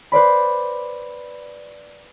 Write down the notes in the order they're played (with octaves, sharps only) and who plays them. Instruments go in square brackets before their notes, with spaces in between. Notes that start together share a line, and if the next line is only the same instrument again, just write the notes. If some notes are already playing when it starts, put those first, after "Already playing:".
[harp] B4 C5 D5 B5